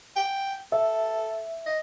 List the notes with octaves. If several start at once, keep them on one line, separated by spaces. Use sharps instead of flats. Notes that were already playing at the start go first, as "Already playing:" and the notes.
G5
A4 E5
D#5